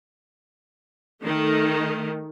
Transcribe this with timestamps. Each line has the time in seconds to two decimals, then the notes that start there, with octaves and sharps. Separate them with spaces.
1.23 D#3 A3